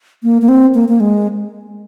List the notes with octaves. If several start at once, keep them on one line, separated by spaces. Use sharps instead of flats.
A#3
A#3
C4
A#3
A#3
G#3